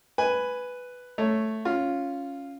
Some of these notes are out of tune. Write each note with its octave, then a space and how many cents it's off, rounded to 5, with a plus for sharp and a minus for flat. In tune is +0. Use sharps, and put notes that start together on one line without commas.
B4 +5 G#5 +0
A3 +0 C#5 +0
C#4 +0 F4 +0